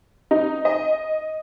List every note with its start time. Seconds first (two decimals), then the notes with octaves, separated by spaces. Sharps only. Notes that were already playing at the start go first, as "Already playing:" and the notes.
0.31 D#4
0.65 D#5